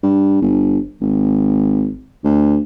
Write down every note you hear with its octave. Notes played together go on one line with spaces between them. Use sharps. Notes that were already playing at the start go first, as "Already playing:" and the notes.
G2
G1
G#1
D2